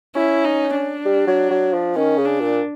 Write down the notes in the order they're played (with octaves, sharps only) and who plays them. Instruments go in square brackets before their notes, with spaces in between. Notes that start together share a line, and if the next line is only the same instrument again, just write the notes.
[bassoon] C#4 [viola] E4
[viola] D#4
D4
[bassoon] G3
F#3
F#3
F3
[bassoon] D#3 [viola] C#4
[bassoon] C#3
[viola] D4
[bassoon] A#2